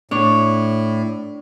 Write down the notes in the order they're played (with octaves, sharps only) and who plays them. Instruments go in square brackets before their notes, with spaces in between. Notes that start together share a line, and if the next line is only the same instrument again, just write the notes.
[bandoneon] A2 [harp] D4 C#5